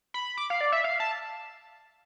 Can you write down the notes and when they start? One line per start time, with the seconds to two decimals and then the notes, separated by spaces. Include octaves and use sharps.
0.14 B5
0.37 D6
0.50 F5
0.61 D5
0.72 E5
0.84 F5
1.00 A5